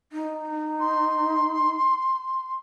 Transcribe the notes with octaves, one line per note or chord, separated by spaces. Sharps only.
D#4
C6